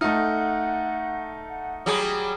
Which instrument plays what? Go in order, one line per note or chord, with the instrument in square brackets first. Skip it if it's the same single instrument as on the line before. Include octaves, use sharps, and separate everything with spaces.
[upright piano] A3 D#4 [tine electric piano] E5 F6 [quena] F#5
[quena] F#5
[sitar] F#3 G3 G#4 [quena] D#6